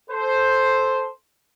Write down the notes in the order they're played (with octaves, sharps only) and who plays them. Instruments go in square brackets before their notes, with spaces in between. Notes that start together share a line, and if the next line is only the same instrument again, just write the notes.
[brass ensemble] A4 C5